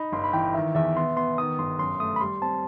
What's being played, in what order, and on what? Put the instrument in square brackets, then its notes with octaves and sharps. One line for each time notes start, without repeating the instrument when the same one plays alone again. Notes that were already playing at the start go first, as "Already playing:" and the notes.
Already playing: [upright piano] D#4 [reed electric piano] B5
[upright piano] G1 [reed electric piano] C6
[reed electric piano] B5
[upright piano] E3 [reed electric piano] G5
[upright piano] D#3 [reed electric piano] E5
[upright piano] E2 [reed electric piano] E5
[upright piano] B3 [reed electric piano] C6
[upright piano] B3 [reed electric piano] C6
[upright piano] D#3 [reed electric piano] D#6
[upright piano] G1 [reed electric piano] C6
[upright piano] F#2 [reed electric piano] C6
[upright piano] A3 [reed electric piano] D#6
[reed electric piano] B5
[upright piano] G3 [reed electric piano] C6
[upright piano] C4 [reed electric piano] A5